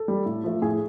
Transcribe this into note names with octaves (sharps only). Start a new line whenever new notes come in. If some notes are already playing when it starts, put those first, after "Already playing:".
Already playing: A4
G3
A2
F3 A3
A2 G#4